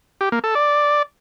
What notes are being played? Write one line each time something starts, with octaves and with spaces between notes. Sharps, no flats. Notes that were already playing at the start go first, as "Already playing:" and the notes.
G4
A#3
A4
D5